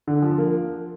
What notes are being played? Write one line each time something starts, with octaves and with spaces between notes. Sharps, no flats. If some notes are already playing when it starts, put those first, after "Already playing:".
D3
F3
A#3